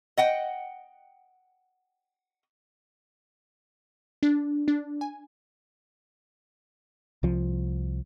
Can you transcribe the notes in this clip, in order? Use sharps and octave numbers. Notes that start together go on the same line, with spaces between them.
D#5 F#5 G5
D4
D4
G#5
C2 F3